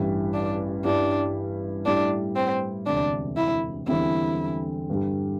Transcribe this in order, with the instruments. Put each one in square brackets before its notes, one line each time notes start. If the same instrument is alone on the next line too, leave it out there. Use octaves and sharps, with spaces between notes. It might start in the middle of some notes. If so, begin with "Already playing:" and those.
Already playing: [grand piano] A1 G2 G3 E4
[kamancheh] D4
[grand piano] G2 G3 E4 [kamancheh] D4
[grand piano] A2 G3 E4 [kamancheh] D4
[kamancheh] C4
[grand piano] E1 D2 C3 [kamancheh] D4
[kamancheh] E4
[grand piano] E2 D3 G3 C4 [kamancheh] E4
[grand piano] G2 D3 G3